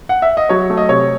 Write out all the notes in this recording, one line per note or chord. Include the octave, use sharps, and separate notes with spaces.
F#5
E5
D#5
F#3 C#5
A3
D#5
C3 C#5